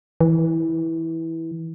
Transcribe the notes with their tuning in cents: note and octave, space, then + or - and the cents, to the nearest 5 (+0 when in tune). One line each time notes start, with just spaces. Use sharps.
E3 -15